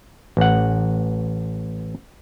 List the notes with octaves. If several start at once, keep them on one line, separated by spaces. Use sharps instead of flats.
A1 F#5